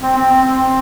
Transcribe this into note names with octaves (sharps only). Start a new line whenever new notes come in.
C4
C4
C4
C4